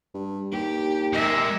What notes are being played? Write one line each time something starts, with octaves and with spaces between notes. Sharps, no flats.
G2
D#2 G4
G#3 G4 A#4 E5